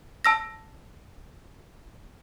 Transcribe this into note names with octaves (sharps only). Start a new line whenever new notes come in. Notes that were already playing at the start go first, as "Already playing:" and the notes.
A5 E6 A#6